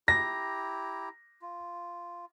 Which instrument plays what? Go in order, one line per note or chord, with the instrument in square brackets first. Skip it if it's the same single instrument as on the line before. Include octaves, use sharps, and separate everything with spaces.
[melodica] E4 G4 A#5 [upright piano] A#6
[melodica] F4